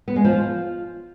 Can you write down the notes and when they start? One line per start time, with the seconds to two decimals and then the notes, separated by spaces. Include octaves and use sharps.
0.08 B3
0.16 G#3
0.24 F3
0.33 F4